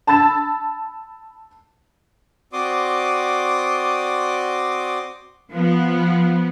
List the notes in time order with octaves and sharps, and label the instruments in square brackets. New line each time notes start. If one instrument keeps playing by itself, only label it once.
[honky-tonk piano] A5 B5 E6 A6 E7
[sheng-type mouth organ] C4 F#4 D5 C6 D6 D#6
[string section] F3 B3